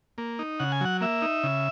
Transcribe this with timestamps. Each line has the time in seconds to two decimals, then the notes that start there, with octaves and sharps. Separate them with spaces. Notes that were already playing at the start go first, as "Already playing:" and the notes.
0.18 A#3
0.39 D#4
0.60 C#3 F#5
0.72 G#5
0.81 F#3 F#5
1.01 A#3 E5
1.22 D#4
1.44 C#3